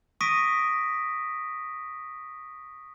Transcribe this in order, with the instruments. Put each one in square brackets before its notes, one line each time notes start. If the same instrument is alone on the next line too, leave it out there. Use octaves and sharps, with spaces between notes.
[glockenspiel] C#6 D#6 A#6 B6 D7 D#7